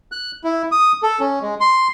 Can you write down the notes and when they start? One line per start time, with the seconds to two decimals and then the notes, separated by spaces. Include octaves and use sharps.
0.12 F#6
0.44 E4
0.72 D#6
1.03 A4
1.20 C#4
1.41 G#3
1.60 C6